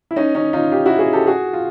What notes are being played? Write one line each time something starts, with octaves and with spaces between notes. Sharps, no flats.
E4
C#4 D#4
C#4 D#4
D#4 F4
F4 G4
E4 F#4
F#4 G#4
G4 A4
F#4 G#4
F4